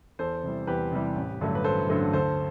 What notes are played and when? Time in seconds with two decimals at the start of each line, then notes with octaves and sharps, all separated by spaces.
0.19 E2 A4 C5
0.43 C3 E3 G3
0.67 E2 G4 B4
0.92 C3 E3 G3
1.16 A1
1.41 G2 D3 F#3 A3
1.55 B4
1.64 A1 A4 C5
1.89 G2 D3 F#3 A3
2.13 D2 A4 C5